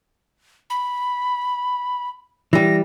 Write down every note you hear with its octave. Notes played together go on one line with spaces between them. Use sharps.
B5
E3 G3 A#6